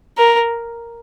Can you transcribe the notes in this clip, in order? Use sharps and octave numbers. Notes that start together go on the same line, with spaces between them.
A#4